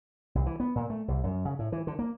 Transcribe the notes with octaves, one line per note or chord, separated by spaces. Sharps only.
C2
E3
B3
A#2
A3
C2
F#2
C#3
A2
E3
D3
A#3